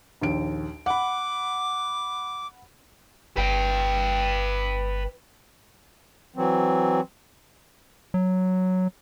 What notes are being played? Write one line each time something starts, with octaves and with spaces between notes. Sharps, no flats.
A#1 D#2 D7
F#5 B5 D6
G1 B4 G5
E3 F#3 C4
F#3